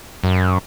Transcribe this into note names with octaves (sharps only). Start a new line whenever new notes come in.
F#2